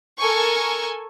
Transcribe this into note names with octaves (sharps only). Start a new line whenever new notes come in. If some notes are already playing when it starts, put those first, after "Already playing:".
A4 A#4 G#5 C#6